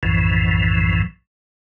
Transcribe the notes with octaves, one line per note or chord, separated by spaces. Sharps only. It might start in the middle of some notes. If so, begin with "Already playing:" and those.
B1 F#2 A2 E3 F3